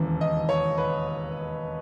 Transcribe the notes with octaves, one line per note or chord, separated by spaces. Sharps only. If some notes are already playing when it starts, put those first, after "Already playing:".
Already playing: E1 D#2 C#3 E3
D#5
C#5
B4